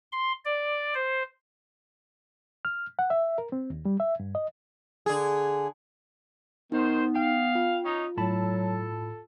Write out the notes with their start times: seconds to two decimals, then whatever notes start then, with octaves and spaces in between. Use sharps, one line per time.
0.12 C6
0.45 D5
0.94 C5
2.65 F6
2.99 F#5
3.10 E5
3.38 A#4
3.52 C4
3.70 D#2
3.85 G3
4.00 E5
4.20 G2
4.35 D#5
5.06 D3 G#4
6.72 D#3 B3 D#4 C5
7.15 F5 G5
7.55 F4
7.85 C#4 D#4
8.17 A2 F#3 A4 A5 B5